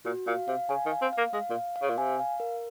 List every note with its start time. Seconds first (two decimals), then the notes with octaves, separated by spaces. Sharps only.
0.05 A#2 F#4
0.27 A#2 F5
0.48 C3 F5
0.69 C#3 G#5
0.86 D#3
0.92 F5
1.02 C4
1.13 F5
1.18 A#3
1.33 G#3 F5
1.50 A#2
1.55 F5
1.76 F5
1.82 C#3
1.90 A#2
1.98 C3 G#5
2.19 F5
2.40 A#4